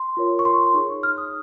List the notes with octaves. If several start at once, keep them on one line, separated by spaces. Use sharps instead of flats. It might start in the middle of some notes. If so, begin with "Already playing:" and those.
Already playing: C6
F4 A#4 C#5
C#6
C6
C6
D#4 G#4 C#5 C#6
F6
D#6